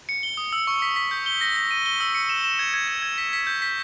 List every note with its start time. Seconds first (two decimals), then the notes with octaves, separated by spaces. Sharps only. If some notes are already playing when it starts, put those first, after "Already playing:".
0.09 C#7
0.23 G7
0.37 D#6
0.53 E6
0.67 C#6
0.82 B6
0.96 B6
1.11 G6
1.26 G7
1.41 A#6
1.56 A#6
1.71 D#7
1.86 G7
2.00 E6
2.15 C#7
2.29 E7
2.44 E7
2.59 G#6
2.74 G#6
2.88 G#6
3.02 G#6
3.18 B6
3.33 B6
3.47 G6
3.62 B6